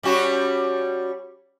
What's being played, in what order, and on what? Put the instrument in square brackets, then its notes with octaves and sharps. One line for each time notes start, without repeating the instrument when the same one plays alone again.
[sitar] G3 C#4 F#4